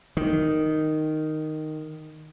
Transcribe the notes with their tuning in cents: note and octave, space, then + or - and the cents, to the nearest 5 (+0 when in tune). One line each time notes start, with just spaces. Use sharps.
D#3 -5